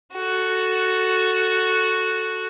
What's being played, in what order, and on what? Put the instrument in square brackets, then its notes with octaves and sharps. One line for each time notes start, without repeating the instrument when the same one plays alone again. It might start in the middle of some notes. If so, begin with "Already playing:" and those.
[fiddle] F#4 A4